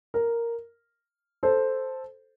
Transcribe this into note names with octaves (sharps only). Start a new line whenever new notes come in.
A#4
A4 C5